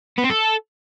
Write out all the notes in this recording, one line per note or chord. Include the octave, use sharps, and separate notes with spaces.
B3
C4
A4